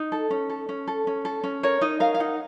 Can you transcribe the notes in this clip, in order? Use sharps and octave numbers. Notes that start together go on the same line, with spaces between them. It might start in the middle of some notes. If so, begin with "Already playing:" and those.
Already playing: D#4
A4
C#4
A4
C#4
A4
C#4
A4
C#4
A#4 C#5
D#4 D#5
A#4 F5
F5
D#4 F#5